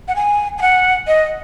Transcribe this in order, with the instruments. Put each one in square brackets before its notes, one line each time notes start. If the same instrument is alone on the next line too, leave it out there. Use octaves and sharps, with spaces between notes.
[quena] F#5
G#5
G#5
F#5
D#5